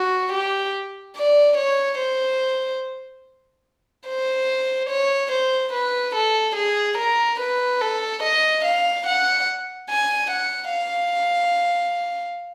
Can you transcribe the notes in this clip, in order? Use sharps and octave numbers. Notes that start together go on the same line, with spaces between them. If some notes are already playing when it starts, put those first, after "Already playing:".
Already playing: F#4
G4
D5
C#5
C5
C5
C#5
C5
B4
A4
G#4
A#4
B4
A4
D#5
F5
F#5
G#5
F#5
F5